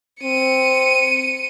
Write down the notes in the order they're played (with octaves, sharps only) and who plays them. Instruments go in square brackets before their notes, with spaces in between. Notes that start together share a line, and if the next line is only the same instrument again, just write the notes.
[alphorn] C4 [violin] C#7 D#7